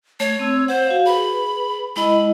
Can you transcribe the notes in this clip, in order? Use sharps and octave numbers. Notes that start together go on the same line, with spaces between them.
A3 C#5
C4 E6
C5 F#5
F#4 F5
G#4 B4 B5
G#3 E4 D#5 B5